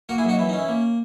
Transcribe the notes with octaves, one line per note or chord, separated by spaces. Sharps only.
A#3 F#4 A#4
E4 G#4
F#2 D#4 F#4
E3 E4
D#4
C#4
E4
A#3